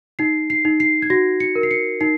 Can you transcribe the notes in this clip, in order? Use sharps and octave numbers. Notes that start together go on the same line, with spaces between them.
D#4 C7
C7
D#4
C7
G#6
F#4 A#6
C#7
A#4
C7
C#7
D#4 C7